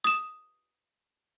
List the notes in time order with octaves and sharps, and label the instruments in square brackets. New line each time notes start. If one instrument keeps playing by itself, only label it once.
[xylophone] D#6 E7